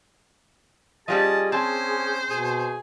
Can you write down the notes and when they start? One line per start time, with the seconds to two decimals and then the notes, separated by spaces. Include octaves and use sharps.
1.08 F3 G3 C#4 G#4 D#5 A5
1.52 C4 C#4 C5 A5
2.31 B2 G#4